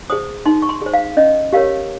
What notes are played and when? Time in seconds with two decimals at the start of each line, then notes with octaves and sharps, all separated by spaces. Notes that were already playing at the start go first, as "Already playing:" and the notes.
0.10 G#4 C5 D#6
0.46 D#4 C6
0.62 C#6
0.69 C6
0.82 G#4 C5
0.94 F5
1.17 C#4 D#5
1.53 G4 A#4 C#5 F5